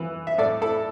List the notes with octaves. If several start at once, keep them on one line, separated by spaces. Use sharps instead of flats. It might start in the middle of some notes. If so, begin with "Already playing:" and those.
Already playing: E3
E5
A2 A4 D5
E4 A4